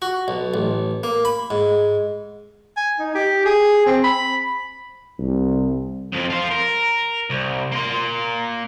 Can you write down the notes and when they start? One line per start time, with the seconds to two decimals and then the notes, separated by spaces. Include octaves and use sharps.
0.02 F#4
0.28 B1
0.54 A1
1.04 A#3
1.25 B5
1.50 G#2
2.77 G#5
2.99 D#4
3.15 G4
3.45 G#4
3.86 C4
4.04 B5
5.20 C2
6.13 F2 F3
6.30 F4 C5
6.51 A#4
7.30 C2
7.72 A#3 C6